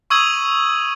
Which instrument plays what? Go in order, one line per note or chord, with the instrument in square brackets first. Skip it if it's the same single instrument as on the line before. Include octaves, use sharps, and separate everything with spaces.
[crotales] C#6 D#6 E6 G#6 D#7 F#7